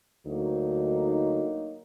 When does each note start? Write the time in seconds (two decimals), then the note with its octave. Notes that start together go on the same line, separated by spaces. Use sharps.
0.25 D2 F#3 A#3 D#4